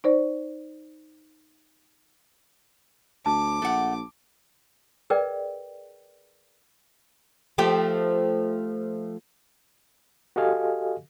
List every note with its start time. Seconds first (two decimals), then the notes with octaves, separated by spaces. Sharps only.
0.04 D#4 C5 D5
3.26 D2 A5 D6
3.62 A#1 A3 F#5
5.10 G#4 A#4 B4 D5 D#5 G5
7.58 F3 A3 G4
10.36 F#4 G4 A4 D#5 F5 G#5